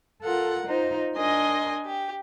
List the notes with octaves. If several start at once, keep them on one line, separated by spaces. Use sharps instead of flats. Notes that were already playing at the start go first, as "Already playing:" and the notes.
F4 A4 A#4 F#5
D#4 F4 C5
D4 A#4 D#5 G#5 C6
G4